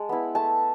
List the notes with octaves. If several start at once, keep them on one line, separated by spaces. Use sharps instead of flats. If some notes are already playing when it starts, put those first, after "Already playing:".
Already playing: G#3 A5
B3 E4
A3 A5